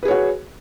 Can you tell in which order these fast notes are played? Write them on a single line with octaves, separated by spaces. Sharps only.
B4 G#4 C#5 F#4